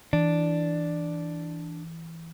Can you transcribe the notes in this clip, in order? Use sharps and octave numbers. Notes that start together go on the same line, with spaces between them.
E3 D4